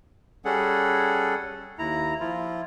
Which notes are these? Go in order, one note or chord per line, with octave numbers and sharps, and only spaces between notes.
G3 C#4 G#4 A4 F#5
D#2 E4 A#5
F3 E4 F4